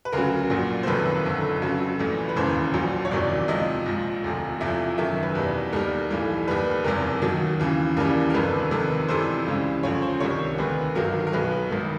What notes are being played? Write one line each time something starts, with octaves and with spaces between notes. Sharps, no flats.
B4
D2 C#3 F#3 A#4
A#1 A#2 F#3
C5
F#1 F2 C3 D#3 B4
F#1 F2 D3
F2 C#3 F#3
A#1 A2 E3
B4
E1 D#2 C#3 E3 C5
A#1 A#2 F#3
C#5
F#1 E2 C3 D#3 F#3 D5
C#2 C3 F3 D#5
A#1 G#2 F3
E1 D2 C3 F3
F1 E2 C3 F3 E5
F#1 F#2 D#3 E5
B4
E2 B2 G3
D#2 D#3 G3 A#4
B1 A2 E3 G3
D#2 D#3 G3 B4
F#1 E2 C3 A#4
D#2 D#3 F#3
D#2 C#3 E3
D#2 C#3 E3 G3 A#4
A#4
G1 F2 C3 D#3 G3 B4
F1 F2 C3 D#3 B4
F2 C3 E3 G3 C5
C#2 C#3 E3 G3
D2 C#3 F3 C#5
C5
C2 C3 D#3 G3 C#5
D2 C3 D#3 B4
G1 G2 D#3 F#3 A#4
A#4
B1 B2 F#3 B4
A1 G#2 D#3